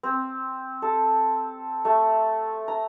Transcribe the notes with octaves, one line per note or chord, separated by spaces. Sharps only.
C4
A4
A3
A#5